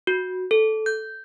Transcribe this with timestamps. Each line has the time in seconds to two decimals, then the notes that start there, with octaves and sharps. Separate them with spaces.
0.07 F#4
0.51 A4
0.86 G6